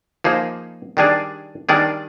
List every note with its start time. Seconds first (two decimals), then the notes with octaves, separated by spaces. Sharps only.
0.24 F3 A#3 D#4 G#4 C5
0.97 D#3 G3 D4 G#4 D5
1.69 D#3 G3 D4 G#4 D5